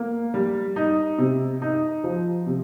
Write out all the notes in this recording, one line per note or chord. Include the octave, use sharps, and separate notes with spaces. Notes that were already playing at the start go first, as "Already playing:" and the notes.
Already playing: A#3
G3
D#4
C3
D#4
F3
C3